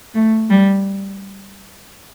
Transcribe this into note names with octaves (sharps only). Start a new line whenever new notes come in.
A3
G3